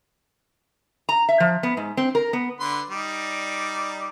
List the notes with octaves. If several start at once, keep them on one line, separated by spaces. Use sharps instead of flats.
A#5
E5
F3
B3
G#2
C4
A#4
B3
D3 B4 C6
G3 D#4 D5